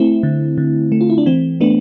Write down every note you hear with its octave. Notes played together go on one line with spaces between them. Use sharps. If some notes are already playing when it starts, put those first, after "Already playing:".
Already playing: A3 C4 E4
D3
D3
A3
F4
E4
D4
E3 C4
A3 B3 D4